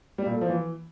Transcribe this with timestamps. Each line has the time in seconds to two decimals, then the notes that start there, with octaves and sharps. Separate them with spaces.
0.18 G3
0.26 A#2
0.34 A3
0.41 F3
0.49 E3